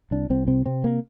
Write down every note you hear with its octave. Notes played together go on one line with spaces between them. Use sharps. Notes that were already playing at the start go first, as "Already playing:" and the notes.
C2 D4
C2 C4
C3 C4
C3 C4
A#3